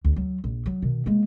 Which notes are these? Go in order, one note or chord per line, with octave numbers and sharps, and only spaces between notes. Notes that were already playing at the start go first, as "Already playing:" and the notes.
D2
F#3
A#1
F#3
B2 D#3
G#3 A#3